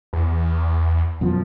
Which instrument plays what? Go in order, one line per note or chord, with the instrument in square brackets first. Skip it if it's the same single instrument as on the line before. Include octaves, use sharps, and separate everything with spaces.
[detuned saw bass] E2
[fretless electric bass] F#2 B2 F3